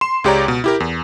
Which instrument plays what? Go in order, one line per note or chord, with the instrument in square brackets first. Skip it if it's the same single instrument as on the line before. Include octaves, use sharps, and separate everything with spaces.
[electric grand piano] C6 E7
C#2 G#3 G4 C#5 D5 A#5
B2
E4 G4 A#4
E2